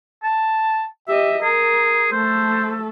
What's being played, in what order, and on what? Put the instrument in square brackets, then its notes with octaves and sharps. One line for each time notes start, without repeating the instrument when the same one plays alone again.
[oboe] A5
[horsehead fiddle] G4 D#5 [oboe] E5
[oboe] G#4 [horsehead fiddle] A#4
[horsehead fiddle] A3 A4 [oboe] C5